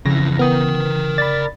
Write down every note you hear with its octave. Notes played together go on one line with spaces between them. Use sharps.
F2 C#3 E3 A#6
E3 B3 A#4 G5 D#6
D5 B5 A6